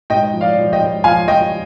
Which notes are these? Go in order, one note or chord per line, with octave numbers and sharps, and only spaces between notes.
G#2 D#5 G5
F3
D5 F5
F3
D#5 G5
G#2
F3 F5 G#5
F3 D#5 G5